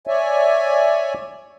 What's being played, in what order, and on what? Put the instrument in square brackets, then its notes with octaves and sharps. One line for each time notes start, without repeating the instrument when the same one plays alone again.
[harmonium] C#5 D5 E5 G#5